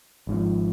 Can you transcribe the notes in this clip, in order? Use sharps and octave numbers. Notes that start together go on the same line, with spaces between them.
G#1 G#2 F3